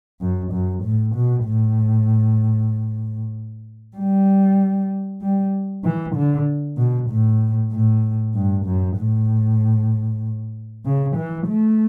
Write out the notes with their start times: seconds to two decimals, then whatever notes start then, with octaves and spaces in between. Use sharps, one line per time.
0.21 F#2
0.52 F#2
0.84 A2
1.15 B2
1.45 A2
3.97 G3
5.22 G3
5.84 E3
6.16 D3
6.77 B2
7.10 A2
7.72 A2
8.35 G2
8.66 F#2
8.97 A2
10.85 C#3
11.16 E3
11.48 A3